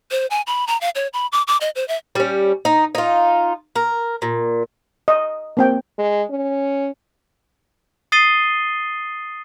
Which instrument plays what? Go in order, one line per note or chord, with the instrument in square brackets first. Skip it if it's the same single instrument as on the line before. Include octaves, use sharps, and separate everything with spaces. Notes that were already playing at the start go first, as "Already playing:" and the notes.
[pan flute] C5
G#5
B5
A#5
F5
C#5
B5
D6
D6
D#5
C5
E5
[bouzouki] G3 C#4
D#4
D#4 F4
A#4
A#2
[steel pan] D#5
A#3 C4 G5
[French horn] G#3
C#4
[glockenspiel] D#6 A6 C7 D#7 G7